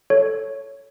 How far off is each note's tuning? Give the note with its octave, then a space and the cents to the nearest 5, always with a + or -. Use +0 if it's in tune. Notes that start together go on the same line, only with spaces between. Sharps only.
A4 +0 C#5 +0